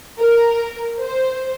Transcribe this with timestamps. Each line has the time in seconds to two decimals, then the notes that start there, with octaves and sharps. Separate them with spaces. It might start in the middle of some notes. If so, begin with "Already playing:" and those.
0.19 A#4
1.00 C5